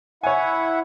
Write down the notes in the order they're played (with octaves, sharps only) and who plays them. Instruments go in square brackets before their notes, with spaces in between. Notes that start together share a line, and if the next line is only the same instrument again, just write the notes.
[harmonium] E4 E5 F#5 [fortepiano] C#5 G#5